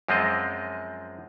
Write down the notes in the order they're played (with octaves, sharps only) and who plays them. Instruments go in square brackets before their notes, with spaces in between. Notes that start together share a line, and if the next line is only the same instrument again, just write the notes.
[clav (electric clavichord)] F#2 F3 G#3 C4 F4 D#5